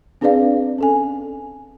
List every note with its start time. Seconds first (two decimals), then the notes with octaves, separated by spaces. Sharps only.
0.21 C4 D4 G#4 B4 D5 F5
0.78 C#4 A4 G#5